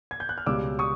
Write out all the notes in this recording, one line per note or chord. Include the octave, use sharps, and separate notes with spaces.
G#6
G6
F#6
F6
C#2 B2 G3 D6 E6
C#6 D#6